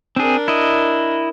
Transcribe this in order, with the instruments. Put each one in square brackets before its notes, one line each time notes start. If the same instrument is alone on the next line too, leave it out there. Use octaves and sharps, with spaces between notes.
[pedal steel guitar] C4 G#4 [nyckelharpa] D4 A#4
[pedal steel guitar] E4 D#5